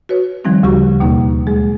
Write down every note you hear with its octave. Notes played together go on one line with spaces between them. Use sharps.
F#4 B4 C#5
D#3 F3 G3 A3 C4 D#4
D2 C#3 F#4 G4 C#6
D#2 B2 A#3 D#4
F#3 G#3 G#4